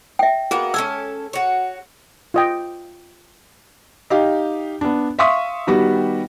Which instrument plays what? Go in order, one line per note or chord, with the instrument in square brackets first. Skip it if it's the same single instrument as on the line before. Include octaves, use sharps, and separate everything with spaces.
[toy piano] E5 G5
[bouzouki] A#3 B3 F#4 [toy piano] G#4
[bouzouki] C#4 A4 G#5 [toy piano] E6
[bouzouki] F#4 C#5
[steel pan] F4 D#5 G5
[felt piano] D#4 G4 F5
B3 D4
E5 F5 C6 C#6 D#6 B6
D#3 G3 B3 F#4 G4